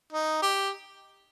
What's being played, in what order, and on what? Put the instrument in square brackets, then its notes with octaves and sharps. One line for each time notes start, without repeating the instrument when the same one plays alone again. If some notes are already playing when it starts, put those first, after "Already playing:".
[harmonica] D#4
G4